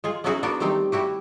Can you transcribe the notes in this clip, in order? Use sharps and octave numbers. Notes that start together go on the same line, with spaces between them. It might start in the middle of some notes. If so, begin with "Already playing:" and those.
G#3 F4 G#4
B3 C#4 D#4 E4 F#4 G#4
B3 D4 F#4 A#4
D#3 G3 A3 C4 D#4
G3 E4 F#4 G4